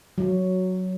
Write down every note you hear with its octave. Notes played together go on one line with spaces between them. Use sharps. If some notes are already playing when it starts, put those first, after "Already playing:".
F#3